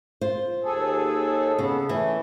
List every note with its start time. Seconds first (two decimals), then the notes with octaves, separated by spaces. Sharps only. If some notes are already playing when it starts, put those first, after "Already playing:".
0.21 F4 C5
0.64 D#2 G#4 A4
1.59 C#3 B3
1.89 E3 A3